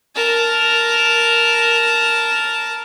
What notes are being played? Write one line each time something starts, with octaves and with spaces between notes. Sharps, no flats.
A#4 A5